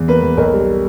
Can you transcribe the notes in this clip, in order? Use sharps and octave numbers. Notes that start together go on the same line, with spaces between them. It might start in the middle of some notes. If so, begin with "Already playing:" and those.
Already playing: E2
A#3 B4
E2
B1 A#4
G3